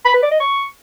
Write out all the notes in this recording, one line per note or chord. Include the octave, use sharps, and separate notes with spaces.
B5
B4
D5
D#5
C#6